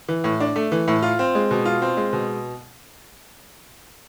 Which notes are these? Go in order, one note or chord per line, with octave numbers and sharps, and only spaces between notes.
E3
A2
D4
A3
E3
A2
F4
C4
G#3
B2
F4
C4
G#3
B2